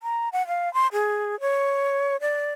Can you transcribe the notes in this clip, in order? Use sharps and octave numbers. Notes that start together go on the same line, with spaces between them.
A#5
F#5
F5
C6
G#4
C#5
D5